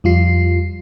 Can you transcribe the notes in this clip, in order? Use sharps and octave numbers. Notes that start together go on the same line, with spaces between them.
F2 G3 F4 C7